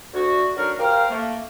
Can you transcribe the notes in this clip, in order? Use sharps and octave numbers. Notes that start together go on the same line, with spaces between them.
D2 F#4
D3 F#3 D#4 F#4 A#4
G4 A#4 C5 F5
A3 A#3